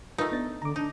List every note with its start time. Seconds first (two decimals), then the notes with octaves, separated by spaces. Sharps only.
0.18 A3 D#4 F4 A#4 B4
0.32 B3 D4 A6
0.62 D3 A#5 D6
0.76 D4 D#4